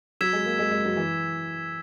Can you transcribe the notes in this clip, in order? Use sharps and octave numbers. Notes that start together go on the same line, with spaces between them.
F#3 E6 G#6 B6 E7
G#3
A#3
G#3
G#3
F#3
E3